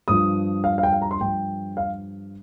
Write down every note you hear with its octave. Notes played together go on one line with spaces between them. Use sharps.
G2 F3 D#6
F5
F5
G5
F5
A#5
C6
G2 F3 G5
F5